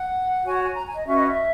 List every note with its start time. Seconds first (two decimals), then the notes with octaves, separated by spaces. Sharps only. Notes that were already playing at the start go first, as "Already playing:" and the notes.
Already playing: F#5
0.45 F#4 C#5 G#5
0.54 F#5
0.63 G#5
0.75 A#5
0.85 G#5
0.95 D#5
1.06 C#4 F#4 B4 E5
1.16 D#5
1.26 E5